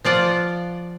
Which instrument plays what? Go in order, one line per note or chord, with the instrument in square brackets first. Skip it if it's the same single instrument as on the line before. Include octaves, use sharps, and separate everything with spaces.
[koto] F3 F4 D5 F#5